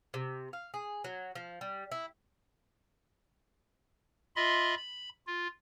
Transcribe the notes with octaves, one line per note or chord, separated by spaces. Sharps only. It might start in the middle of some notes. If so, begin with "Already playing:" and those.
C3
F5
G#4
F#3
F3
G3
E4
F4 D#5 E5 B5 C6
B5
F4